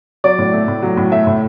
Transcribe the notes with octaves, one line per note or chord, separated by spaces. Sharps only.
F#3 D5
A2
A3
A2
F#3
A2
A3 E5
A2